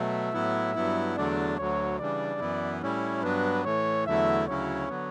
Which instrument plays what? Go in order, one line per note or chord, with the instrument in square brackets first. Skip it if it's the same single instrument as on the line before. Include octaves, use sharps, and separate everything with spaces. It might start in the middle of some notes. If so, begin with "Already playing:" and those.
Already playing: [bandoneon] B2 F#3 A3 [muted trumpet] E5
[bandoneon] A2 F#3 B3 E4
G2 F#3 B3 E4
[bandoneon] E2 D3 F#3 A3 D4 [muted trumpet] D5
[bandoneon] D2 D3 F#3 [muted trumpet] C#5
[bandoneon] C#3 E3 G3 D4 [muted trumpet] D5
[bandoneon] F#2 E3 B3 E4
[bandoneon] A2 G3 C#4 E4 [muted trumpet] C#5
[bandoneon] G2 F#3 B3 D4 [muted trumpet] B4
[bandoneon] A2 E3 A3 [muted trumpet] C#5
[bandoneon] E2 D3 F#3 A3 E4 [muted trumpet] E5
[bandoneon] D2 C#3 F#3 C#4 E4 [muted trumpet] C#5
[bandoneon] D3 F#3 B3